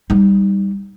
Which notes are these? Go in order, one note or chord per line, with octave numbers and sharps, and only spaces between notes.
G3 D#4